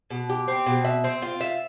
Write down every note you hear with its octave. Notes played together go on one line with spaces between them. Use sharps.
B2
G4
C4
B2
E5
C4
F4
E5